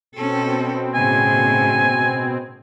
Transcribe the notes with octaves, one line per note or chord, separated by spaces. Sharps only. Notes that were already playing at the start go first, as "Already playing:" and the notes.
B2 C4 C#4 A4
A2 C#3 G#5